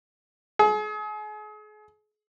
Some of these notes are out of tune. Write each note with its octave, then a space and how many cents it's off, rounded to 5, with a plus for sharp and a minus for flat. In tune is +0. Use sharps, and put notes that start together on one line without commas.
G#4 +35